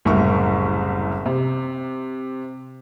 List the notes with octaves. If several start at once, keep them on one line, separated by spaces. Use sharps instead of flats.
F#1 C2 A2 A#4 E5 C#6
C3